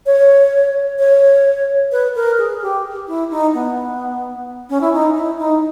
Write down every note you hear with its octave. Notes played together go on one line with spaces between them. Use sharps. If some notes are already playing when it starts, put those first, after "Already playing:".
C#5
C#5
B4
A#4
G#4
G4
E4
D#4
B3
C#4
E4
D#4
E4
D#4